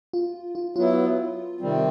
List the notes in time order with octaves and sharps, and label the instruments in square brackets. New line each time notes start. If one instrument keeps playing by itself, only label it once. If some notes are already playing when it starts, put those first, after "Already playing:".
[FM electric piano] F4
F4
[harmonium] F#3 B3 E4 [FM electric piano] F4
[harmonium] C3 D#3 G3 C4